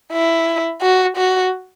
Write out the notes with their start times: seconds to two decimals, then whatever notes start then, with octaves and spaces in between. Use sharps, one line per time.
0.12 E4
0.82 F#4
1.17 F#4